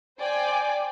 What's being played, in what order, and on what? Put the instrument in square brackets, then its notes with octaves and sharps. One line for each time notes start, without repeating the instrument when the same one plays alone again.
[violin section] C5 D5 G5 G#5 D6